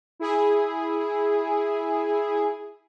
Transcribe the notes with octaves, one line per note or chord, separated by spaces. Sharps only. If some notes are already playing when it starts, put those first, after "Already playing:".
E4 G#4